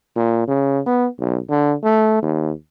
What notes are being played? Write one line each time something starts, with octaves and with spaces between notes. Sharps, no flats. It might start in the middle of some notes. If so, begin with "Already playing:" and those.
A#2
C#3
B3
B1
D3
A3
D#2